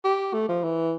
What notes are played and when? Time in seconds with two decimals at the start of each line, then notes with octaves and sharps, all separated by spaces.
0.04 G4
0.33 A3
0.49 F3
0.64 E3